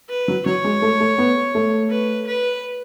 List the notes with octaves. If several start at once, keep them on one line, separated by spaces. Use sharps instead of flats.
B4
F#3
F#3 C#5
G#3
A3
A3
B3
A3
B4
B4